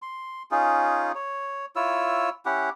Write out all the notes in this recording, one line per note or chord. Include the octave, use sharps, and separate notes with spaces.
C6
C#4 D#4 F4 G#4
C#5
E4 F4 C#5 E6
C#4 E4 G4 F#5